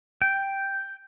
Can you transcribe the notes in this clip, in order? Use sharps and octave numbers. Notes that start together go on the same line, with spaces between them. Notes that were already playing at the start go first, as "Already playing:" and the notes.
G5